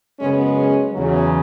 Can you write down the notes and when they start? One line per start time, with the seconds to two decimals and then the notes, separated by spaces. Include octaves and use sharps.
0.19 F#2 C#3 G#3 B3 C#4
0.57 C#4
0.93 E2 C#3 F#3